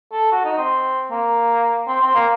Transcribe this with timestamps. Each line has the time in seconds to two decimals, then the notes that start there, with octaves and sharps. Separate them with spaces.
0.12 A4
0.32 F#4
0.45 D#4
0.58 C4
1.11 A#3
1.88 C4
2.01 C4
2.14 A#3